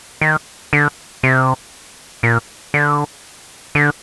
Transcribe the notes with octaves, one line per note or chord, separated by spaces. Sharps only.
D#3
D3
C3
A#2
D3
D3